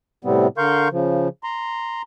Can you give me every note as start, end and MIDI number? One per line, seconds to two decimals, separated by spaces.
0.25 0.47 45
0.25 0.47 48
0.25 0.47 55
0.25 0.47 59
0.25 0.47 60
0.58 0.88 50
0.58 0.88 70
0.58 0.88 77
0.58 0.88 84
0.58 0.88 85
0.58 0.88 91
0.91 1.28 49
0.91 1.28 53
1.44 2.02 82
1.44 2.02 84